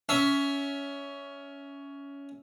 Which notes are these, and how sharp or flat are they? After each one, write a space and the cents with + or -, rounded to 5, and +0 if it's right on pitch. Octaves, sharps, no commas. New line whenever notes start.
C#4 +15 E5 -5